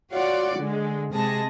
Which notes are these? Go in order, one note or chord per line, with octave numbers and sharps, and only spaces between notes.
F4 F#4 C#5 D5 F#5
D3 G#3
C3 G#3 G#4 A5 A#6